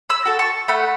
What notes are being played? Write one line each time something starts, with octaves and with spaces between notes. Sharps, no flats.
B5 E6
F#4 A4
A5 C#6
A3 F#5 B5